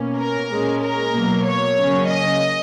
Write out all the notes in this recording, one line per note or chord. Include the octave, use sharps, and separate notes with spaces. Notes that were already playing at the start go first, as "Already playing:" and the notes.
Already playing: B2 A#3 C#4
A#4
A#2 G#3 C#4
A#4
B2 F#3 A#3
C#5
C#3 F#3 A#3 C#4
D#5